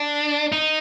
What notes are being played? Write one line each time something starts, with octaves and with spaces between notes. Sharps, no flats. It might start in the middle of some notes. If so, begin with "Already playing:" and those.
Already playing: D4
D#4